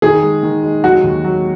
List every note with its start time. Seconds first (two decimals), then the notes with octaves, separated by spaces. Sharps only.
0.02 D#3 G#4
0.23 G#3
0.43 D#3
0.64 G#3
0.84 F#3 F#4
1.04 D#2
1.24 F#3